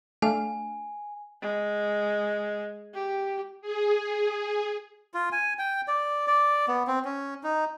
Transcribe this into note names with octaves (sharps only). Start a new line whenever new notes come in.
A3 D4 F5 G#5
G#3
G4
G#4
F4
G#5
G5
D5
D5
B3
C4
C#4
D#4